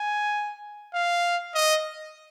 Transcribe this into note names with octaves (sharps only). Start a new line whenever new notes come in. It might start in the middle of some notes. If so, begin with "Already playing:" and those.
Already playing: G#5
F5
D#5